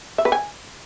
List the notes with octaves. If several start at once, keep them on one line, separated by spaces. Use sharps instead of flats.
E5
B4
G#5